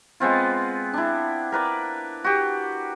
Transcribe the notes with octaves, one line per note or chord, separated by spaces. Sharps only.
G#3 B3 C4 F4
D4 E4
A#4 B4 D5
F#4 G4